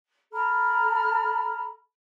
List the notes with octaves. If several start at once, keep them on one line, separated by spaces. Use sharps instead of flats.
A4 A#5 B5 F6